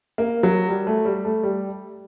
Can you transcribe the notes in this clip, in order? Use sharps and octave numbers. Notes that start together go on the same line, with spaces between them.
A#3
F#3
G3
A3
G3
A3
G3